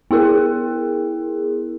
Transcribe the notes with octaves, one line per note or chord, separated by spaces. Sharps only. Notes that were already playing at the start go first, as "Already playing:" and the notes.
B3 E4 G#4 A#4